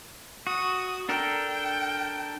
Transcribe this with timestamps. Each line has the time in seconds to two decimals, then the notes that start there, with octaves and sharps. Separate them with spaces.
0.47 F#4 D#6
1.09 D4 A4 A#4 G5